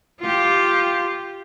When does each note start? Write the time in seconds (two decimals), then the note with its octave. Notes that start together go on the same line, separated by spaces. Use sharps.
0.20 F4 G4